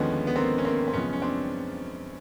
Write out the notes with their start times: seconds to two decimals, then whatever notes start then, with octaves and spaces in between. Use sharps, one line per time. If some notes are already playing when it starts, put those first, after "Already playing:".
Already playing: D#2 D3 F3 G#3 B3 C#4
0.27 B3
0.36 A#3 C4
0.58 C#4
0.65 A#3 C4
0.88 C4
0.93 F#2 C#3 F3 G#3 B3 C#4
1.13 C#4
1.22 C4 D4